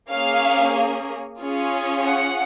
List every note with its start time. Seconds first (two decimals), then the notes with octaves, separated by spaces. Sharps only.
0.11 A#3 C#4 G#4 F5
1.40 C#4 F4 G#4
2.06 F#5